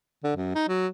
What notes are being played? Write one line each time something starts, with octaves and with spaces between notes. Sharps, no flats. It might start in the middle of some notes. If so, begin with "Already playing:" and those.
D3
F#2
D#4
F#3